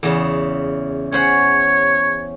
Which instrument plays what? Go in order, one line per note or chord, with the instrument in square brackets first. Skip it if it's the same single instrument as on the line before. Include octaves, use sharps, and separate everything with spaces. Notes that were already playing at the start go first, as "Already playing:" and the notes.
[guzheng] E2 C#3
[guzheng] C#4 C5 F#5 [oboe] C#5